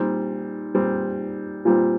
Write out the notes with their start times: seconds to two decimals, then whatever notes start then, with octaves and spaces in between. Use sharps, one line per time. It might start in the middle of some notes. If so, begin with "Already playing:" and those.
Already playing: A#2 G3 C4 D#4
0.74 A#2 G3 C4
1.65 A#2 G3 C4 F4